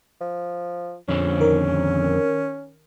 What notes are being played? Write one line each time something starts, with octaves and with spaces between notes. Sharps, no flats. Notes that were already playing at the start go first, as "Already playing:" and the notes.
F3
F2 D3 C4 C#4
D#3 A#4